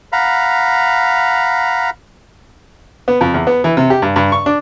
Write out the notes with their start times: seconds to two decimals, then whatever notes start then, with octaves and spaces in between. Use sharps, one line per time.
0.12 F5 F#5 A#5 B5
3.08 B3
3.21 F2
3.34 E2
3.47 B3
3.64 E3
3.77 C3
3.90 G4
4.02 G2
4.16 G2
4.32 C#6
4.46 D4